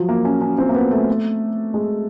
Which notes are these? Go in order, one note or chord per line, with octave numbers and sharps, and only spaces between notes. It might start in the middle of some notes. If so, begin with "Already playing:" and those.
Already playing: F3 F#3
A#3
C#4
C#4
C4
A#3
B3
A3
G#3